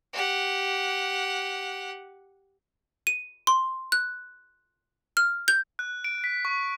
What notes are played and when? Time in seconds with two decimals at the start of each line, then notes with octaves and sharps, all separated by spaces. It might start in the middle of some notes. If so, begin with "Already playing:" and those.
0.13 G4 F#5
3.07 D#7
3.47 C6
3.92 F#6
5.17 F6
5.48 G6
5.79 F#6
6.04 D7
6.24 B6
6.45 C#6